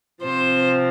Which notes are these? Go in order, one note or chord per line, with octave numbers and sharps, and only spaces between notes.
C3 F3 C4 C5